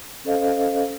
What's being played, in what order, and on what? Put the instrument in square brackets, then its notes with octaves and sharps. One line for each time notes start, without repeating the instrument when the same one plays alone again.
[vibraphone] C#4 A4 C5 D#5 F5